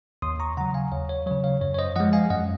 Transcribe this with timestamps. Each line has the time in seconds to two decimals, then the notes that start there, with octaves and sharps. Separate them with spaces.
0.22 D#2 C6 D#6
0.40 A#5 C#6
0.57 C#3 F#3 F#5 A#5
0.74 F5 G#5
0.92 D#2 C#5 F5
1.09 C#5
1.26 C#3 F#3 C#5
1.44 C#5 F5
1.61 F#2 C#5
1.74 C#5
1.79 C5 D#5
1.96 F3 G#3 D#5 F#5
2.13 F5 G#5
2.30 F#2 D#5 F#5